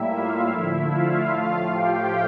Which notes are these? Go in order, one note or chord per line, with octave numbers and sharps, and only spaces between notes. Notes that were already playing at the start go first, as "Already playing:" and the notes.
Already playing: A2 G3 A#3 E4 E5
F4 F5
D3 F3 A3 E4 E5
F4 F5
A2 F3 A3
G4 G5